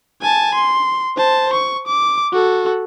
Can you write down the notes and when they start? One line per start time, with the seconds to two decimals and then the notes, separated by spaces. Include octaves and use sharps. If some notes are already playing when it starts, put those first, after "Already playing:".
0.22 G#5 A5
0.54 C6
1.17 C5 A5
1.53 C#6
1.87 D6
2.32 F#4 A4